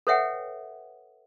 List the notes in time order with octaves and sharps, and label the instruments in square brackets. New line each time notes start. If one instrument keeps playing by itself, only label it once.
[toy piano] A4 B4 C#5 E5 F#5 G5